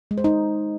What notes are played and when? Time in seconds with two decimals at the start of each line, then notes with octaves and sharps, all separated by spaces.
0.11 G#3
0.18 C5
0.24 D#4